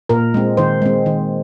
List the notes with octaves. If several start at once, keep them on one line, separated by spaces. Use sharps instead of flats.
A#2 A#4
G#3 C4
D#3 C5
G#3 C4
D#3